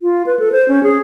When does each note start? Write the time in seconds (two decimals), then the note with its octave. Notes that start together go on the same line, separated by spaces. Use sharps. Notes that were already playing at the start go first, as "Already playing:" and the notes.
0.01 F4
0.26 B4
0.39 A4
0.52 C5
0.68 C#4
0.83 G#4